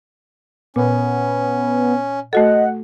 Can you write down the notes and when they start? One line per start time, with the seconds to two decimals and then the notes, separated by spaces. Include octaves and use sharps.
0.76 A#2 B3 C#4
2.33 A3 F#4 A4 D#5 F#5